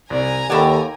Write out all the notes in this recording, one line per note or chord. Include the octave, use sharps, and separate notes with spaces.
C2 D5 G#5 A#5
D#2 A4 C#5 D5 F#5 G5 B5